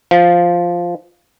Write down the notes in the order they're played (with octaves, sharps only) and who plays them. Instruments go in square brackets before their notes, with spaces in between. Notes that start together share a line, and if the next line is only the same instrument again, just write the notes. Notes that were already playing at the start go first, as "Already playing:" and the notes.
[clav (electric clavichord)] F3